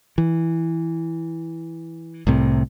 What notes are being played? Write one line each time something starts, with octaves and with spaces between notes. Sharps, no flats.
E3
C2 A2 C3